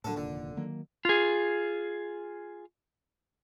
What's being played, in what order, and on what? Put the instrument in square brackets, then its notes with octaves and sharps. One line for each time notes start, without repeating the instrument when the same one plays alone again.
[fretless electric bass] A2 F#3 [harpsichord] D3 A4
[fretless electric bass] F1 D#2 A#2 [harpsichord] D3
[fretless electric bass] D#3 F#3 A#3
[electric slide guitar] F4 G#4